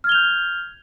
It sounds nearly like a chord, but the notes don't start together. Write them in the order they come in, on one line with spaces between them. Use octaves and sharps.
F6 G#6 G7 F7 G6